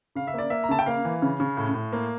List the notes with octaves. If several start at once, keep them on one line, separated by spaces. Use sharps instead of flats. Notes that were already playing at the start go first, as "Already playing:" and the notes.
C#3 F5
E5
A#3 D5
A#3 E5
A#5
C#3 A5
G5
A#3 F5
E3
C#3
C#3
A2
A2
A#3